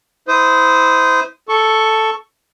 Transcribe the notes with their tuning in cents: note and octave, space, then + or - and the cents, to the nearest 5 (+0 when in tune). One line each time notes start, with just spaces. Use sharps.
E4 -25 C5 -20 D#6 +0
A4 +0 C#6 +0